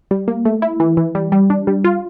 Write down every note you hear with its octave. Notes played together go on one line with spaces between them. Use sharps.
G3
A#3
A3
E4
E3
E3
G3
G3
D4
G3
F4